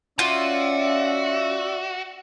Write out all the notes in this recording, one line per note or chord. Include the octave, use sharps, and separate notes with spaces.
C#4 F4 F#4 D5 E5